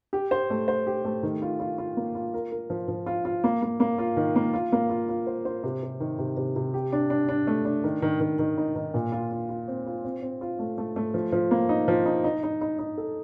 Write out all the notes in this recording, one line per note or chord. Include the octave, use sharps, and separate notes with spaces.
G4
C5
A3
C5
G4
A3
D#3
F4
F4
F4
A#3
F4
A#4
A#4
F3
F3
F4
F4
A#3
A#3
A#3
F4
D#3
A#3
F4
A#3
F4
F4
C5
C5
C3
C3
D#3
C3
C3
C3
G4
D4
D4
D4
A3
D4
D#3
D#3
D#3
D#3
D#4
D#3
A#2
F4
F4
F4
C4
F4
C4
C4
F4
A3
A3
A3
F3
F3
A#3
D#4
F3
D#4
D#4
D#4
D#4
D#4
A4